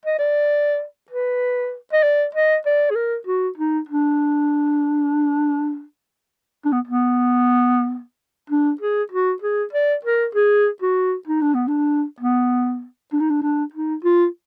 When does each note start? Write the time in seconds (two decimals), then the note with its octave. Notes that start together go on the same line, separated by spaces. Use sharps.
0.05 D#5
0.18 D5
1.10 B4
1.93 D#5
2.03 D5
2.35 D#5
2.66 D5
2.90 G#4
2.95 A#4
3.27 F#4
3.58 D#4
3.89 D4
6.65 D4
6.72 B3
6.87 B3
8.50 D4
8.81 G#4
9.11 F#4
9.42 G#4
9.73 D5
10.05 A#4
10.35 G#4
10.82 F#4
11.27 D#4
11.41 D4
11.54 B3
11.68 D4
12.20 B3
13.13 D4
13.20 D#4
13.29 D4
13.42 D4
13.73 D#4
14.04 F4